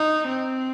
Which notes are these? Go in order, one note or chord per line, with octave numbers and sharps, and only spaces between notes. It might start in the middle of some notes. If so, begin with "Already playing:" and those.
Already playing: D#4
C4